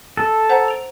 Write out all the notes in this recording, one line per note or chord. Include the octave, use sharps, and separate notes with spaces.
A4
C5 F#5 A#5
D7 F7